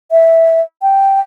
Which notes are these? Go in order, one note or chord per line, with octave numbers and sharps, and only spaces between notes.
E5
G5